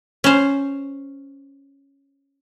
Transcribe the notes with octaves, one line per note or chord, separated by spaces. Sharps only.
C#4 C5